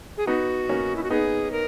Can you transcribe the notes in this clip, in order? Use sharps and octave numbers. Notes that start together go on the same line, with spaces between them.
G#4
B3 D#4 F#4
A#3 C#4
E4
F#4
B3 D#4 G#4
A#4